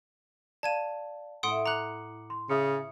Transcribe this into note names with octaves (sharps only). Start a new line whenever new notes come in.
D5 F5 A5 G#6 D#7
A2 E4 F#5 C6 D#6 D7
A#5 D6 F#6 C#7 F#7
C6
C#3 E5 D#6 C#7